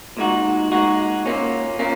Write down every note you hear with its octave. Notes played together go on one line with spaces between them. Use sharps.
A#2 G#3 D#4 F#4
A#2 G#3 D#4 F#4
A#2 A#3 C#4
A#2 A#3 C#4